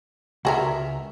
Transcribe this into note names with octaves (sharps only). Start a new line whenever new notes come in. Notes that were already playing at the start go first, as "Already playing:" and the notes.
C#2 F#4 G#4 A#4 E5